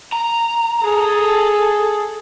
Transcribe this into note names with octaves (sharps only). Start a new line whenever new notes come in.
A#5
G#4 A4